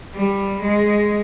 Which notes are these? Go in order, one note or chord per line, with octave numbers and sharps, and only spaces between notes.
G3
G#3